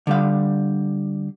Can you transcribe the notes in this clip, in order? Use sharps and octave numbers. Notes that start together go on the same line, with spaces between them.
D3 G3 F5